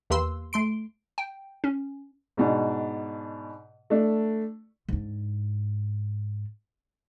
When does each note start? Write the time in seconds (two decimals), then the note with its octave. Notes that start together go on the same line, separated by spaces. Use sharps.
0.10 E2 A#3 G4 B4 C6 E6
0.53 A3 C6 D7
1.18 G5
1.64 C#4
2.37 G#2 B2 D4
3.90 A3 D4
4.89 G#2 D4